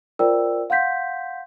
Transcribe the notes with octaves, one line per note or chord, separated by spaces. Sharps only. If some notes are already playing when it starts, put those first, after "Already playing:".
F4 A#4 C5 D5 G5 E6
F5 F#5 C6 G6 B6